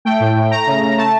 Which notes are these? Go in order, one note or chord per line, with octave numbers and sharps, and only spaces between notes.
A3 G5
A2
A2
A3 A#5
C#3
C#3
A3 A5